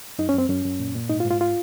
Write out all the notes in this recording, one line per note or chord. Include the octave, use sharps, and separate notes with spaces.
F#2 D#4
C#4
F#2
C4
F#2 C#4
F#2
A#2
A#2
G#2 D#4
F4
G#2
F4
F4